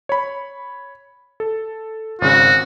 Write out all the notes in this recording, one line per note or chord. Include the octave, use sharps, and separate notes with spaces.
C#5 B5
A4
G#1 C#3 F#4